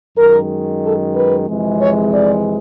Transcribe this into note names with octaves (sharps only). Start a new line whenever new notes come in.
F#2 D#3 G#3 A#4
A4
B4
F2 C3 E3 G#3
C#5
D5